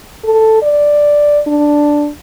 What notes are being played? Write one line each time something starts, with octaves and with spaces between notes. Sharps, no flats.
A4
D5
D4